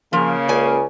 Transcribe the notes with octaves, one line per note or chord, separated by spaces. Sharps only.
C#3 F3 A#3
C#2 D5 G#5